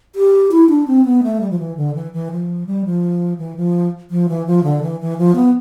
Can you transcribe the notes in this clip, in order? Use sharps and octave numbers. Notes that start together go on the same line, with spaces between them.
G4
E4
D4
C4
B3
A3
G3
F3
E3
D3
E3
E3
F3
G3
F3
E3
F3
F3
E3
F3
D3
E3
E3
F3
B3